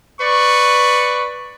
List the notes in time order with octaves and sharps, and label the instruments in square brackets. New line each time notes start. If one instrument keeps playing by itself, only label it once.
[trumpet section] B4 D5 C#6